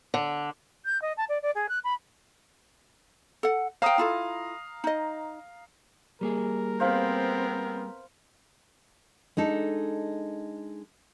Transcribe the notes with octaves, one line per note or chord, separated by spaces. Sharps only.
D3
G6
D#5
A5
D5
D5
G#4
F#6
B5
A4 F#5
C5 F5 G5 A#5 D#6
E4 F4 A4
D#4 D#5
G3 A#3 G#4 A#4
B3 C4 C5 F5 B5
G#3 D4 D#4 A4